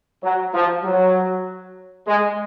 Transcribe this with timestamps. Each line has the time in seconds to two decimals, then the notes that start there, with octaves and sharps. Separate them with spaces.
0.23 F#3
0.54 F3
0.84 F#3
2.08 G#3